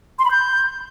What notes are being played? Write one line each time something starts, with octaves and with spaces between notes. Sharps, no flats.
C6
B5
G6